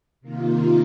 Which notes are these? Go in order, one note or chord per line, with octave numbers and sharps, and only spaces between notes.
C3 D#3 A#3 F4